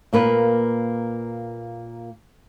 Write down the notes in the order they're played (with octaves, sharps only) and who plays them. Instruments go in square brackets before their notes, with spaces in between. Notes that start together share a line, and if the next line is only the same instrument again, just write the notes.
[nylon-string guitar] A#2 A#3 B4